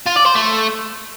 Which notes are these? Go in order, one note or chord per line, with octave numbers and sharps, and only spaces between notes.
F4
D5
C5
A3